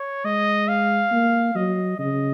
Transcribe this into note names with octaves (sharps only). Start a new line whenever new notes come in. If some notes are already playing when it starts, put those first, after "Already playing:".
Already playing: C#5
G#3 D#5
F5
A#3
F#3 D#5
C#3 D#5